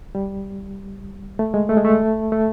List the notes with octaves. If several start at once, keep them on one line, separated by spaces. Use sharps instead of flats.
G3
A3
G#3
A3
G#3
A3
A3